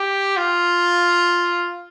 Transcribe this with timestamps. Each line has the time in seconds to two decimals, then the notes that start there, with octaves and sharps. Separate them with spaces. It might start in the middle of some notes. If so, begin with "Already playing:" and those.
Already playing: G4
0.37 F4